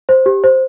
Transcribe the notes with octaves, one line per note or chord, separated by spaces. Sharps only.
C5
G4
C5